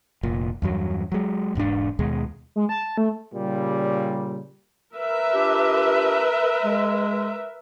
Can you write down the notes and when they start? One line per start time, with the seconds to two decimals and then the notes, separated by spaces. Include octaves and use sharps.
0.23 F1 A#2
0.62 E2 G2 F#3
1.12 F#3 G#3
1.55 E1 G#2 C#4 D4
1.99 D#2 B2 G#3
2.56 G#3
2.69 A5
2.98 A3
3.34 A#2 C#3 G3
4.94 A#4 B4 E5
5.33 D4 F4 G4
6.65 G#3